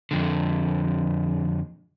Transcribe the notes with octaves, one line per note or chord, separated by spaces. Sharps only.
F2 D3